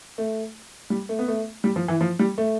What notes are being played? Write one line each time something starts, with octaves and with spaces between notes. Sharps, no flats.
A3
G3
A3
B3
A3
G3
F3
E3
F3
G3
A3